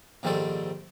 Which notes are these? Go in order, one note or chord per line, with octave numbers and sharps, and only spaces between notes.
A#1 G#2 D#3 G3 C4 A4